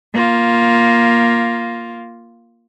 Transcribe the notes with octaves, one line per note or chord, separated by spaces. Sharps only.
A#3 F4